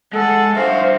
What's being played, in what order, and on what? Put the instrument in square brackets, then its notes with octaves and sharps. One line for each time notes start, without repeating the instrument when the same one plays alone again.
[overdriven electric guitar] G#3 G#5 [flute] A4 [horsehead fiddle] F#5
[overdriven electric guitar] G2 F#4 [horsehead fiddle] C5 [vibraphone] E5 [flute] F5